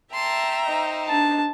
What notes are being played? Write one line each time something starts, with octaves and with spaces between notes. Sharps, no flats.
E5 G5 A5 A#5 C6
D#4 C5
D4 A5